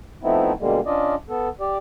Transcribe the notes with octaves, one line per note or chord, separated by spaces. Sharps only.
F3 A3 B3 C4 D#4 E4
B2 D3 G3 G#3 A#3
C#4 D4 F4 D5 D#5
B3 A4
G4 D5